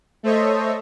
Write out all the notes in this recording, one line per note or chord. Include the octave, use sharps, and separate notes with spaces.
A3 A4 C5 C#5 D#5 E5